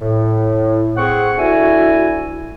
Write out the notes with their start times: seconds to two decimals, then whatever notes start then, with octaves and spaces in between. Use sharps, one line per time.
0.01 A2
0.97 C4 G#4 F#5 C#6
1.37 D2 E4 F#4 E5 G#5